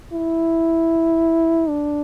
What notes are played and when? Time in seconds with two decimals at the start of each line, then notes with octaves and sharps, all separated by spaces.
0.12 E4
1.69 D4